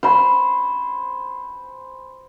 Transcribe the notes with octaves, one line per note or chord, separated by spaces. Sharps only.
C5 G#5 B5 C#6